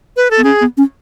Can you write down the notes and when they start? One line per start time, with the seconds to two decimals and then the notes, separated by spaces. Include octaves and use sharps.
0.17 B4
0.31 A4
0.38 B3
0.44 C#4 G#4
0.61 B3
0.77 C#4